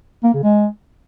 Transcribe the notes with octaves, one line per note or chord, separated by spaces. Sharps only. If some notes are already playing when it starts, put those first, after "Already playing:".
A#3
C#3
G#3